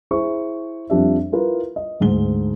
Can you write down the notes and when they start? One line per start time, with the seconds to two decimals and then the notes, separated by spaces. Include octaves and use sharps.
0.11 E4 G#4 C5 C#6
0.90 F2 F3 G3 D4 G4 E5
1.32 E4 F4 A#4 B4
1.76 D#5
2.00 D2 G#2 G7